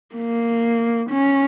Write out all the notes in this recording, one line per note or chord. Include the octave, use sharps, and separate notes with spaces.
A#3
C#4